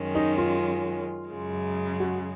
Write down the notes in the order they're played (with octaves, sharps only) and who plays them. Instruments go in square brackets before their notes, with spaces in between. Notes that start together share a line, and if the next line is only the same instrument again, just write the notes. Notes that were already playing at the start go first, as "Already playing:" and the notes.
Already playing: [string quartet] F#2 D#3 G#3 C#4
[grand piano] D#4
F4
[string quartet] F#2 C#3 G#3
[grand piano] F#4